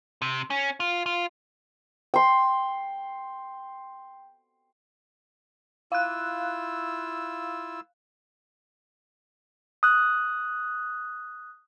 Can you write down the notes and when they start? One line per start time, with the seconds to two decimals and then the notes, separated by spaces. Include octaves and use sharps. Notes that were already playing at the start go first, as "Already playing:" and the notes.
0.22 C3
0.50 C#4
0.80 F4
1.06 F4
2.14 G5 C6
5.92 E4 F4 F5 E6 F#6
9.83 D#6 F#6